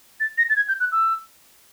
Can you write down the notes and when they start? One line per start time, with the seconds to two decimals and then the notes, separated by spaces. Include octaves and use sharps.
0.20 A6
0.38 A#6
0.50 A6
0.56 G#6
0.68 G6
0.80 F#6
0.92 E6